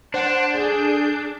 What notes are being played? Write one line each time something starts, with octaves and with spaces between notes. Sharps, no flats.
D4 C5 F#5
G#4 A4 G6